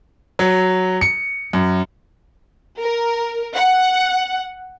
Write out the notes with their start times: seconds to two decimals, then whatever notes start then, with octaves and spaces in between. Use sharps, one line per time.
0.39 F#3
1.01 C#7
1.53 F#2
2.79 A#4
3.55 F#5